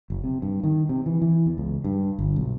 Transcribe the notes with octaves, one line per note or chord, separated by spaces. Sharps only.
F#1
C3
G2
D#3
C3
E3
E3
E2
C#2
G2
G1
B1